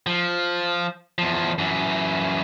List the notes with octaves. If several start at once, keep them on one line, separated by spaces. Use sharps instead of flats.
F3
E2 F3
F#2 E3